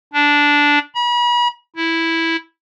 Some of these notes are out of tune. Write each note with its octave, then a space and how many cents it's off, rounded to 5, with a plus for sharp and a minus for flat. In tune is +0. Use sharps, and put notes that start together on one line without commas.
D4 -10
B5 -40
E4 -5